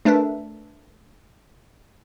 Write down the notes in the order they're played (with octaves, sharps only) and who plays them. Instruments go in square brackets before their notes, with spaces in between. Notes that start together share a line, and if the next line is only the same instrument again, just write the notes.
[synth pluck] A3 D4 A#4 B4 E5